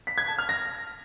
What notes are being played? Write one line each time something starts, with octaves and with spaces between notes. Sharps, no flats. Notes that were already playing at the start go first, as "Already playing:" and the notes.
B6
G#6
A5
F6
A#6